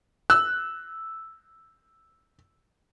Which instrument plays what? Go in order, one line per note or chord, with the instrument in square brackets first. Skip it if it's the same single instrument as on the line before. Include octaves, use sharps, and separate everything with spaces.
[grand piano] E6 [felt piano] F#6